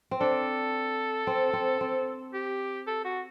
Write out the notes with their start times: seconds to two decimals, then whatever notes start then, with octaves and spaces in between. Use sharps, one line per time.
0.11 C4
0.21 D4 A4
1.27 C4
1.53 C4
1.81 C4
2.34 G4
2.87 A4
3.05 F#4